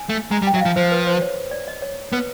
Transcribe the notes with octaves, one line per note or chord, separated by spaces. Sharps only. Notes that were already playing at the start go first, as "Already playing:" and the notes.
Already playing: G#5
A3
G#3 A#5
G3
G5
F#3 E5
F3 F5
F3 C5
B4
C5
C#5
D5
D#5
C#5
B3 B4